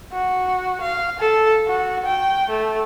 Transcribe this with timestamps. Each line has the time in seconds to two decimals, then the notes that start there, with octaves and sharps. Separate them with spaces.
0.12 F#4
0.81 F5
1.20 A4
1.68 F#4
2.06 G5
2.50 A3